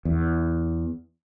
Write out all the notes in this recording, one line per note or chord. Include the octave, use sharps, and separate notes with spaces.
E2